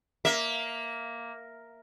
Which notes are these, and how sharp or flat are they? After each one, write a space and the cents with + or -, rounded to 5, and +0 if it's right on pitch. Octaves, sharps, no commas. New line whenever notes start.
A#3 +0 E5 -10